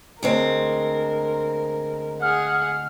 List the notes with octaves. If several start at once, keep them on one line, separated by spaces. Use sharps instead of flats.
D2 G#3 C4 A#4
G#4 F#5 F6